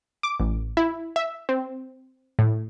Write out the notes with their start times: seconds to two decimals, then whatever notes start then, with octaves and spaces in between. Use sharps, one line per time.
0.23 D6
0.40 A1
0.77 E4
1.16 E5
1.49 C4
2.39 A2